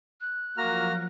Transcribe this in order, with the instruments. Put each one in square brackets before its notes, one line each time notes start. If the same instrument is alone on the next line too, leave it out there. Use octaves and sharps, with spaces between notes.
[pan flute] F#6
[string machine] F3 F#3 [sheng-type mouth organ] A#3 F#4 F6 [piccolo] A#5